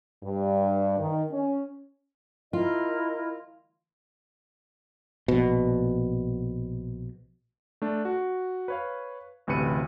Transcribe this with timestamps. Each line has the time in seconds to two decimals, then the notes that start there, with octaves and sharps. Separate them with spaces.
0.24 G2
0.99 D#3
1.32 C#4
2.53 E4 F4 A#4 D#5
5.28 A#1 B2
7.82 A3 D4
8.05 F#4
8.68 B4 C#5 F5
9.47 A1 D2 C3 B4 C#7 D#7